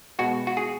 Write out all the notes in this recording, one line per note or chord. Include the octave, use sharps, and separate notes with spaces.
B2 G#3 F#4
F#4
G#4